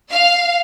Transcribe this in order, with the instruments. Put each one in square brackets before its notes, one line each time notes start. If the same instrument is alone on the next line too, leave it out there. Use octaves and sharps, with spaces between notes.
[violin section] F5